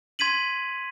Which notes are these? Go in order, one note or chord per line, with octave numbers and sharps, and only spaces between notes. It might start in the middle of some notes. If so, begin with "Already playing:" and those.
C6 G#6 B6 D#7 F#7